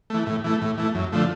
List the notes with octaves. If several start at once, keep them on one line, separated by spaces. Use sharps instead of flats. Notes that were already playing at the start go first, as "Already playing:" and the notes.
E3 A3
A2
E3 A3
A2
E3 A3
F#2
D3 F3 A3